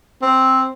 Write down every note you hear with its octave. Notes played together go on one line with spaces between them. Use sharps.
C4